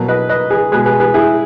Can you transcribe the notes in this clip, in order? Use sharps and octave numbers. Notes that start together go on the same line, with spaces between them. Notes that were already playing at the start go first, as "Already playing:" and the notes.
Already playing: B2 F#3 A#3
B4 D#5
B4 D#5
G#4 B4
B2 G#3 G#4 B4
G#4 B4
G#4 B4
E4 G#4